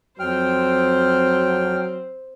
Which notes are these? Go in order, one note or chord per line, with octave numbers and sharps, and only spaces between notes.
F2 F#3 C4 C5 G5 F6